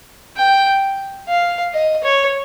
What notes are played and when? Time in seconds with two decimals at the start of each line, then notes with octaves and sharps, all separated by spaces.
0.37 G5
1.28 F5
1.74 D#5
2.04 C#5